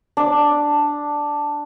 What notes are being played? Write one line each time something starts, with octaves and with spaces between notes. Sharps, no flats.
D4